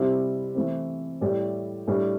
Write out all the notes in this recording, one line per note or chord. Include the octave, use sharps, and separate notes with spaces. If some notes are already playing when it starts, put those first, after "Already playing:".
Already playing: C3 G3 E4 G4 C5
E3 A3 C4
A2 G3 E4 G4 D5
A2 G3 D4